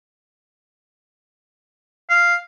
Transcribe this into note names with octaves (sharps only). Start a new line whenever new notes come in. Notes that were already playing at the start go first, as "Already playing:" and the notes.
F5